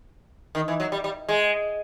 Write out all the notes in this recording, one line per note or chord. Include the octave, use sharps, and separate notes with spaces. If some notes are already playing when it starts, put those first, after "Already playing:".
D#3
E3
F#3
G3
G3
G#3